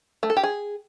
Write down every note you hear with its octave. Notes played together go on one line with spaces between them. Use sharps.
A3
A4
G4
G#4